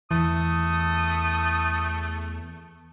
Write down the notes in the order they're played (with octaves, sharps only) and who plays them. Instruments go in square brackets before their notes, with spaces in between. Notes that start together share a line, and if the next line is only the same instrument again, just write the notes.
[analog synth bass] E2 [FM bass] E3 [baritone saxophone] A3 [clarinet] D#6